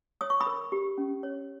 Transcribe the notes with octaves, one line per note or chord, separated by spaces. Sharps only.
C#5 D#6
C#6
B5 D#6
A#4
G4
C#4
C#5